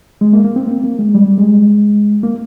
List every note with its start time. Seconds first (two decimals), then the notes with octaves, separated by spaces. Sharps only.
0.21 G#3
0.33 A#3
0.44 A#3
0.56 C4
0.67 A#3
0.84 A#3
0.99 G#3
1.15 G3
1.38 G#3
2.23 A#3